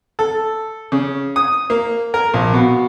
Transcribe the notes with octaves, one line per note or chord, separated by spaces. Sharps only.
A4
C#3
D#6
A#3
A#4
A#1
B2